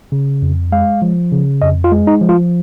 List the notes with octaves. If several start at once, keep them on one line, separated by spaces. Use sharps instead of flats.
C#3
F2
G#3 F5
F3
C#3
F2 D#5
F4
G#3
D#4
F3
F4